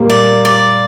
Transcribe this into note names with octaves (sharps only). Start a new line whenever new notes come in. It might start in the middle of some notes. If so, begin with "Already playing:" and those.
Already playing: A#2 G3 A#3
D5
D5